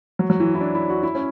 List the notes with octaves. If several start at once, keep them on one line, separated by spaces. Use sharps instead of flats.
F#3
F#3
E3
E4
D4
E4
F#4
E4
C#4